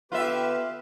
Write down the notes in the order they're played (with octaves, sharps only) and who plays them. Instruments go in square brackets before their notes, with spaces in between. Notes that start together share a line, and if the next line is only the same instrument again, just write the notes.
[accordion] D3 G4 [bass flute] B3 [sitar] F4 E5 [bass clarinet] B4